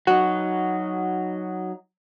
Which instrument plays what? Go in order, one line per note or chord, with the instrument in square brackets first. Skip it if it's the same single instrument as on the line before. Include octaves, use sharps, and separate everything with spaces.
[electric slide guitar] F#3 D#4 [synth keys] F#4